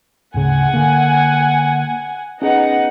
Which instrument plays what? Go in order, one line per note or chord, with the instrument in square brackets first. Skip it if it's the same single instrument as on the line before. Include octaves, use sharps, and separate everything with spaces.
[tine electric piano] D2 G#2 C#3 [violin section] F#5 G#5
[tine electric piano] D3 A#3
[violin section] B3 D#4 F#5 [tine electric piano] C#4 G#4